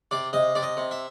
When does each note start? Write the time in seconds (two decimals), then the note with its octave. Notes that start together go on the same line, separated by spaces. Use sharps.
0.11 C3 D5
0.33 C3 D#5
0.55 C3 D5
0.63 D#5
0.77 C3
0.91 E5